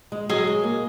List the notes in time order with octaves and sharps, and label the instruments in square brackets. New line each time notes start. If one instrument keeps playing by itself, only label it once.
[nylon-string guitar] G#3
[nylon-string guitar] F#3 [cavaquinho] G#4 D#5 G#5
[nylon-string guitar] G#3
A#3